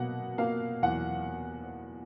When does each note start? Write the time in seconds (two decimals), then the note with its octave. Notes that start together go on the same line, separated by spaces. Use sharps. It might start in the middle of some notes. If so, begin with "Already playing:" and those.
Already playing: B2 A#3 F#5
0.38 A#3 F5
0.82 E2 F#5